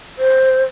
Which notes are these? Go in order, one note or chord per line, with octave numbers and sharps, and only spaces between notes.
C5